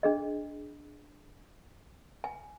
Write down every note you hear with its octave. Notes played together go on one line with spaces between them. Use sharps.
D4 G#4 D#5
G#5